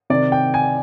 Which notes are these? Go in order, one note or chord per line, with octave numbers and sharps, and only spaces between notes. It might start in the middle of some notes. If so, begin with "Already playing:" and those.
C3 D#3 D5
G5
G#5